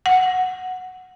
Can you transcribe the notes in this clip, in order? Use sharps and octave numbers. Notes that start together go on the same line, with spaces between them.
F#5